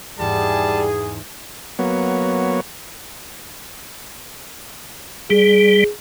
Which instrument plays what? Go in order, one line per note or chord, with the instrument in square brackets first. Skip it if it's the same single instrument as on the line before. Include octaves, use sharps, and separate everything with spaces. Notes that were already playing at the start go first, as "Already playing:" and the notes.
[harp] E2 G#2 [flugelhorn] G3 [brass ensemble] G#4 [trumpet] A5
[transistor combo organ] F#3 A#3 B3 C#5
[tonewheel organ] G3 [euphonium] G#4